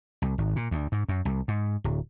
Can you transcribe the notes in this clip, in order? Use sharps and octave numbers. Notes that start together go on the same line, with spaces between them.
C2
G#1
A#2
D2
G#2
F#2
C2
G#2
D1